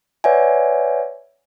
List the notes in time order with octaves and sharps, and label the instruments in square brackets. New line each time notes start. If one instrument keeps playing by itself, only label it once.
[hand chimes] B4 C#5 D5 E5 F#5 G#5